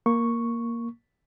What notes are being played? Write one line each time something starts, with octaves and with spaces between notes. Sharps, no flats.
A#3 C#6